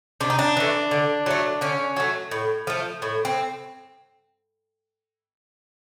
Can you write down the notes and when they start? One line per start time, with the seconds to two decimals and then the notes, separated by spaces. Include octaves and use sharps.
0.20 C3 D4
0.30 D#4
0.39 D4
0.57 E3 A3
0.91 D3
1.26 F#3 A3
1.61 D3 C#4
1.97 F#3 A3
2.31 A2
2.67 F3 A3
3.02 A2
3.25 C4